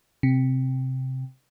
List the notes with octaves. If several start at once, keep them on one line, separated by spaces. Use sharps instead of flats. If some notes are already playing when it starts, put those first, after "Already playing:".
C3